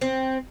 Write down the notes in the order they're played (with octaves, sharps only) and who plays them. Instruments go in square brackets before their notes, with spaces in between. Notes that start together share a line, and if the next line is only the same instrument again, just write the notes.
[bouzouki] C4